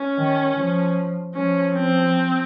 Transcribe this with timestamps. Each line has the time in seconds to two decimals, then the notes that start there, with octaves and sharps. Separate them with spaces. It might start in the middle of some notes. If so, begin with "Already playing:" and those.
Already playing: C#4
0.17 D#3
0.56 F3
1.34 F3 C#4
1.74 C4